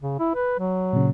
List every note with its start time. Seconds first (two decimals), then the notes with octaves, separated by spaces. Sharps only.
0.02 C#3
0.20 E4
0.35 B4
0.59 F#3
0.93 A#2 C#3